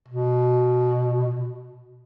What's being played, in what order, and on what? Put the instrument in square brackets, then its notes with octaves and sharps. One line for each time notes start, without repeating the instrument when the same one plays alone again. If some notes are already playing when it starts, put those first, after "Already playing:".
[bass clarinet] B2